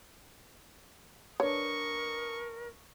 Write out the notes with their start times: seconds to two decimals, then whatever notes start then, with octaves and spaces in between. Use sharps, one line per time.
1.40 D4 A#4 B4 C#5 C#6 D#6